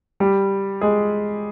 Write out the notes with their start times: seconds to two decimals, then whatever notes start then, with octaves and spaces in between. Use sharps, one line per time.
0.20 G3 G4
0.81 G#3 G#4